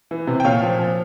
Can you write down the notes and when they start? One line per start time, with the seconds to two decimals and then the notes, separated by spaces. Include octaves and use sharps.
0.11 E3
0.27 C3
0.40 G5
0.44 A#2 C#5 F5
0.62 F3
0.79 F3